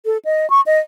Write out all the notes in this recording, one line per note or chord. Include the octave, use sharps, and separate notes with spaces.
A4
D#5
C#6
D#5